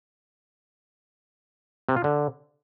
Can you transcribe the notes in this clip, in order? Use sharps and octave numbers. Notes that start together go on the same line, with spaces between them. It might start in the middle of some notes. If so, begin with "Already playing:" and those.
C3
F4
D3